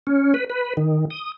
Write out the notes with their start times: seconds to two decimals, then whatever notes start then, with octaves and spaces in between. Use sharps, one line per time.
0.07 C#4
0.34 B4
0.50 B4
0.77 D#3
1.10 D#6